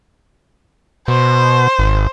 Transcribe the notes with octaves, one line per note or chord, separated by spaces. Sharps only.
B2 C5
G#1